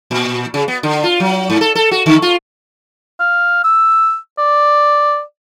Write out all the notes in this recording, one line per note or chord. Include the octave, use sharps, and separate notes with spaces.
A#2
C#3
B3
D3
F4
F#3
G#2
A4
A4
F#4
D3
F4
F5
E6
D5